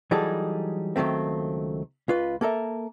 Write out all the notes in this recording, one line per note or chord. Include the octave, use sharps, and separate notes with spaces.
E3 F#3 G3 D#4 G#4 A4
C#2 D#3 F#3 A3 C4
C#2 F4 B4
A#3 A4 A#4 E5